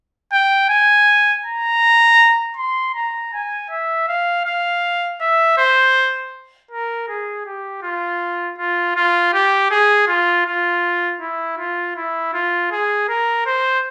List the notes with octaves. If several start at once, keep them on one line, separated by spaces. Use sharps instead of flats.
G5
G#5
A#5
C6
A#5
G#5
E5
F5
F5
E5
C5
A#4
G#4
G4
F4
F4
F4
G4
G#4
F4
F4
E4
F4
E4
F4
G#4
A#4
C5